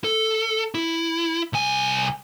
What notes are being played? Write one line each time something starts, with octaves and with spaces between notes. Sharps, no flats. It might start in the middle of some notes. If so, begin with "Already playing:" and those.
A4
E4
C2 G#5